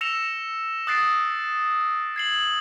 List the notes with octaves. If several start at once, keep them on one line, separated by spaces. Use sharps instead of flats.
E6 A#6 C#7 E7 F7
D#6 F#6 A6 C7 D7
G#6 C7 F#7